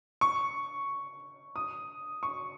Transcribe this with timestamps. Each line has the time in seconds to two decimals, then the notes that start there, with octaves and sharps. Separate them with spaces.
0.21 C#6
1.56 D#6
2.23 C#6